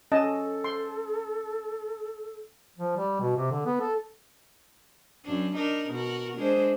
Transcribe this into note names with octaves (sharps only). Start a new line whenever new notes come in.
C#4 A4 D#5 A5
C6
F3
G3
B2
C3
D3
B3
A4
F#2 D4
D4 D#4 A#4
B2 F#4 A#4
G#3 D4 C5